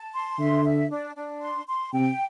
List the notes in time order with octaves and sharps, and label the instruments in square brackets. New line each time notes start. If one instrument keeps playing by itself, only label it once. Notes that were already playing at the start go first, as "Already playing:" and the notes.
Already playing: [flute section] A5
C6
[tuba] D3 [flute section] E5
[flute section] E5
D4
D4
C6
C6
[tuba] C3 [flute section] G5